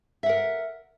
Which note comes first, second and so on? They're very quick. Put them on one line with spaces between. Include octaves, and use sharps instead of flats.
E5 F#5 A#4